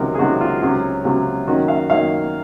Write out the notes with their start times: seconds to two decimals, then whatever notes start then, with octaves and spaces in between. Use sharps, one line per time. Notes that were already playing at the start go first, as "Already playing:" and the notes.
Already playing: C#2 C3 D#3 F#3 A#4
0.15 G#4
0.19 C#2 C3 D#3 F#3 F#4
0.41 F4
0.62 C#2 C3 F#3 C#4
1.05 C#2 C3 F#3 C#4
1.47 F#2 D#3 A#3 C#4 F#4
1.68 F5
1.90 F#2 D#3 A#3 C#4 F5